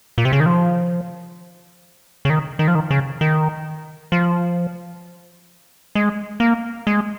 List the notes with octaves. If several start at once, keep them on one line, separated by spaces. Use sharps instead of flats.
A#2
C3
C#3
D#3
F3
C#3
D#3
D#3
F3
D#3
C#3
D#3
F3
G#3
A#3
G#3